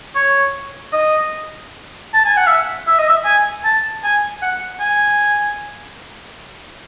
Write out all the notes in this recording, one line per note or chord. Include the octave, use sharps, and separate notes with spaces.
C#5
D#5
A5
G#5
F#5
E5
E5
D#5
E5
G#5
A5
G#5
F#5
G#5